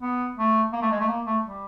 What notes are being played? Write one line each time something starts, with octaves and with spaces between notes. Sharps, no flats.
B3
A3
A#3
A3
G#3
A3
A#3
A3
G3